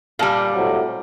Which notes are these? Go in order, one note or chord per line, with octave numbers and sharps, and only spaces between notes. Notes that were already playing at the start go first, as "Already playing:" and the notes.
A#2 G3 F5 A5
A2 C3 F#3